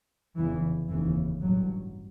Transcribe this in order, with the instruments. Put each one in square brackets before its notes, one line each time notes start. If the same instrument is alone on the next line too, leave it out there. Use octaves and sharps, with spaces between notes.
[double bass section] F1 E2 C#3 E3
F1 D#2 C#3 E3
A1 G2 F#3